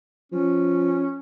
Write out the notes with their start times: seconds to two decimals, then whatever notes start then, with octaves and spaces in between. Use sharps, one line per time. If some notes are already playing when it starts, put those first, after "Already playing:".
0.32 F3 C#4